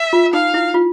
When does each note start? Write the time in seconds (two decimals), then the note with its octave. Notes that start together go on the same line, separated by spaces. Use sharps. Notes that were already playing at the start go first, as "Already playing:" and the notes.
Already playing: E5
0.13 F4
0.33 D#4 F5
0.54 E4
0.74 F4